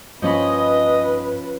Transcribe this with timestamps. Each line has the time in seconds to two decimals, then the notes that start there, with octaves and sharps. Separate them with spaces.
0.22 G2 F3 C#4 B4 D#5 B5